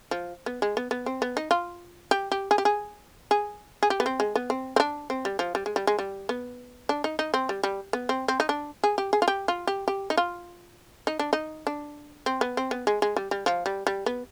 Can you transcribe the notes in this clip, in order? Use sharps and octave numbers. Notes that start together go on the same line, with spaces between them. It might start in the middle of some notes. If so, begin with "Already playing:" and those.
F3
B3
G#3
B3
B3
C4
B3
D#4
F4
G4
G4
G#4
G4
G#4
G#4
G#4
G4
B3
C4
G#3
B3
C4
C4
D4
C4
G3
F3
G3
G#3
G3
G#3
G3
B3
D4
D#4
D#4
C4
G3
G3
B3
C4
C4
D#4
D4
G#4
G4
G#4
F4
G4
F4
G4
G4
D#4
F4
D#4
D4
D#4
D4
C4
B3
C4
B3
G#3
G#3
G3
G3
F3
G3
G3
B3